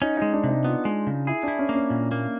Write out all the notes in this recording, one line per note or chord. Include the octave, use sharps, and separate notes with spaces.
C#4 D#4
G#3 D#4
D4
C3
D#4
B3 F4
G#3
C#3
E4 G#4
D4 E4
C#4
A#3
C#4
A#2
A#3